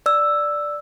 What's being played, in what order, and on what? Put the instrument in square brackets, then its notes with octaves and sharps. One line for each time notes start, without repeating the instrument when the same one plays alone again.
[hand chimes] D5 E6